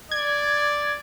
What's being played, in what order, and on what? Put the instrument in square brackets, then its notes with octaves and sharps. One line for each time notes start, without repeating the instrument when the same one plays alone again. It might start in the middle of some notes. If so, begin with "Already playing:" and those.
[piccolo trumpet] D5 [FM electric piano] G#6